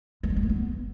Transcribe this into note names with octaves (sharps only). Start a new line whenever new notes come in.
G#3
F#3
G#3
A3
B3